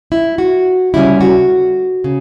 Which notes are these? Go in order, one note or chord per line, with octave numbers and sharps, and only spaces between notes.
E4
F#4
D2 C#3 G3 C#4 E4
F#4
C#3